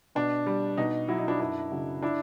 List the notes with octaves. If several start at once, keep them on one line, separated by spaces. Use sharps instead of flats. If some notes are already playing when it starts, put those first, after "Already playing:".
B2 D4
G3
B2 D#4
F#3 E4
D#4
D4 E4
F#2 D4 E4
C#3 F#3
D4 E4